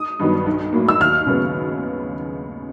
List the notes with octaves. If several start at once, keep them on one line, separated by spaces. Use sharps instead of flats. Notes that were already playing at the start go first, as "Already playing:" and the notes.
Already playing: D#6
G2 D#3 F#3 B3
B1
A2 F#3 A#3
E6
D#2 F6
C#3 F#3 B3